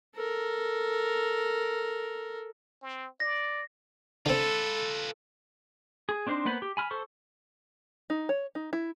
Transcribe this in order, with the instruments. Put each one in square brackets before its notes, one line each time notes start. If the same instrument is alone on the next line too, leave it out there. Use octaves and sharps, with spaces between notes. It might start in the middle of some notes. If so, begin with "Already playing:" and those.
[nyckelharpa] A4 A#4
[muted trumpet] C4
[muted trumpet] D5 [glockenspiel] A#6
[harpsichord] D3 C4 [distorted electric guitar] F4 B4 [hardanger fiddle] A4
[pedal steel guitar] G#4
C4 D4 D#4 C5
A#3 B3 B4 C5 B5
G4
G#5 B5 F6
A4 C5 C#6
[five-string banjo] D#4
C#5
D#4
E4